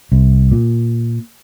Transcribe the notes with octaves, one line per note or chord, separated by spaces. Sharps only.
C2
A#2